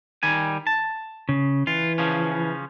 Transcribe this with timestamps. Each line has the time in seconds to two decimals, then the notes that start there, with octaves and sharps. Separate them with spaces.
0.23 D#3 G3 G#5
0.67 A5
1.29 C#3
1.67 E3 F4
1.98 C#3 F3 C#4